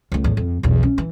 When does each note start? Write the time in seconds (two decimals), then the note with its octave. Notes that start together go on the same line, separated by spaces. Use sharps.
0.12 C#2 A3
0.24 E2 A2
0.37 F2
0.63 B1 E2
0.83 C#4
0.98 E3